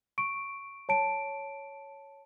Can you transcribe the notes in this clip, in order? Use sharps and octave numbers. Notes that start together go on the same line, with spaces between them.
C#6 D7
C#5 A5 D7